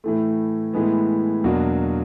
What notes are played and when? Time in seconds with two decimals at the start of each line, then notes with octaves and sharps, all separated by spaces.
0.04 A2 E3 A3
0.73 A2 E3 G#3 B3
1.44 E2 B2 F#3 A#3 D4